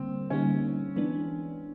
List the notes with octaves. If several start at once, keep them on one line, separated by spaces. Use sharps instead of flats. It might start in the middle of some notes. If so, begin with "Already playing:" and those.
Already playing: D3 G3 A#3 C4
D3 G3 A#3 C#4 D#4
E3 G#3 B3 D4